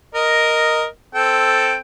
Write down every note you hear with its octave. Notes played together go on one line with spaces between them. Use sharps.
A#4 D#5
C4 A4 G5